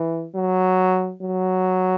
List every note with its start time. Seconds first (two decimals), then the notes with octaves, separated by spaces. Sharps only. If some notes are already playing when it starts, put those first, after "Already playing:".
Already playing: E3
0.35 F#3
1.22 F#3